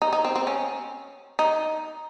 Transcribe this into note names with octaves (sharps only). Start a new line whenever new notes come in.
D#4
D#4
C4
C4
C#4
D#4